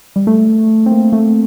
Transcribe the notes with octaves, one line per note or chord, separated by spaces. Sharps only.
G3
A3
C4
A#3
A3